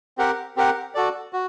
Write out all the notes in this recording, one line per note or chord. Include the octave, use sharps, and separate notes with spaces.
C4 G4 A#4 F#5
C4 G4 A#4 F#5
F#4 A4 D5
F#4